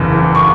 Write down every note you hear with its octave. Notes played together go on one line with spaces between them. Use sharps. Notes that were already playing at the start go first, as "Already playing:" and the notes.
Already playing: F#1 E2 C#3 E3
C#6